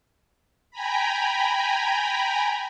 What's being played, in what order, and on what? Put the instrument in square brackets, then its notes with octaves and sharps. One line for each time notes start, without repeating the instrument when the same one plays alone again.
[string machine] G5 G#5 A#5 B5